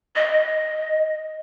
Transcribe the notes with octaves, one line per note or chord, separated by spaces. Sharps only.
D#5